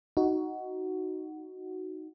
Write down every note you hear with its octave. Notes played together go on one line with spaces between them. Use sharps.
D#4 F#4